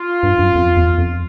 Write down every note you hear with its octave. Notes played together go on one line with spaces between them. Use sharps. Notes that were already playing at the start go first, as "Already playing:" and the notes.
Already playing: F4
G2
F#2
F2
E2
F2